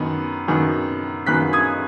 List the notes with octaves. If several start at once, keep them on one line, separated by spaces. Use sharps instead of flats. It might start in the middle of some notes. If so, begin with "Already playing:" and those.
Already playing: F#2 D#3 B3
F#2 D#3 B3
F#2 D#3 B3 F#6 B6
D#6 G#6